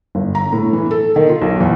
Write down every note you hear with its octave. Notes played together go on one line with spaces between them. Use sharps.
G1
A#5
A2
E3
A4
D#3
F4
B1
E2